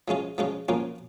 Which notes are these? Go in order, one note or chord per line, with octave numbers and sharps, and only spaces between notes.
F3 G#3 C#4 F4
F3 G#3 C#4 F4
F3 A#3 C#4 F4